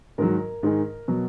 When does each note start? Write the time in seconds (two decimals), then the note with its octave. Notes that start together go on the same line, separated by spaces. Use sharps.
0.18 G#2 D#3 F#3 A#4
0.63 G#2 D#3 G#3
1.08 B2 F#3